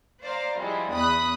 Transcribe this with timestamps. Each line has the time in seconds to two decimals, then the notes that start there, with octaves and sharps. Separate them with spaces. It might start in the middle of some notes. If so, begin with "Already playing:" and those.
0.22 C5 D5 F5 A#5
0.59 F3 G3 G#3 E4
0.91 E2 B5 D#6 F#6